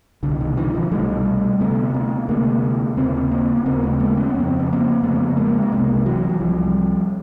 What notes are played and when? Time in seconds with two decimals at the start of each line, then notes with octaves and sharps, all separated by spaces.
0.23 C2 B2 D3
0.40 D#3
0.57 D3 E3
0.74 D#3 F3
0.91 C2 B2 G3 A3
1.60 D2 C3 A3 B3
1.94 A3 B3
2.28 D2 C3 G#3 A#3
2.97 D#2 C#3 A#3 C4
3.31 A#3 C4
3.57 B3
3.65 D#2 C#3 A#3 C4
3.83 A3 B3
4.00 G#3 A#3
4.17 B3 C#4
4.34 F2 C#3 C#4
4.47 C4
4.60 B3
4.72 A#3 C4
5.03 F2 C#3 A3 B3
5.37 G#3 A#3
5.62 B3
5.72 C2 C3 G#3 A#3
6.06 E3 F#3
6.29 F#3
6.40 C2 C3 F3 G3